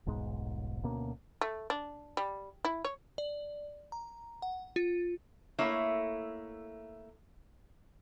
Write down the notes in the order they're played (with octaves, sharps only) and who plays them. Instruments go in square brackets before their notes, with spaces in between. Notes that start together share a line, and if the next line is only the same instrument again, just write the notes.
[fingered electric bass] D#1 B1 G#2 G#3
D2 B2 A#3 C#4
[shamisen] A3
D4
G3
E4
C#5
[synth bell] D5
A#5
F#5
F4
[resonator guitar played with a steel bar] A3 A#3 E4 C#5 E5